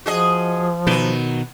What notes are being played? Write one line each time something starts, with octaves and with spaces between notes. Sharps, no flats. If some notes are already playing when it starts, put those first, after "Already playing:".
F3 F#4 G#4 D#5
B2 D#3 F#3 B4